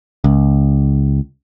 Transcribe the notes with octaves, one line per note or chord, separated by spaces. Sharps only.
C#2